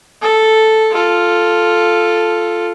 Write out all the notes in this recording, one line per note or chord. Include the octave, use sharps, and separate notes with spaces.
A4
F4 A4